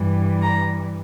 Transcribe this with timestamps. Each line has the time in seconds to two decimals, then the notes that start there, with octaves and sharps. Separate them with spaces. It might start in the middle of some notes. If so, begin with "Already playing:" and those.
Already playing: G2 E3 G3
0.41 A#5